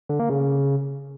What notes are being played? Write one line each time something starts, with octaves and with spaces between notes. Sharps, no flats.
D3
A#3
C#3